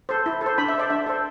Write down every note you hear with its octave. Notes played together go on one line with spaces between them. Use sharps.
A4 C5
E4
A4
C5
D4 B5
E5
A4 C5 D5
D4 E5
A4 C5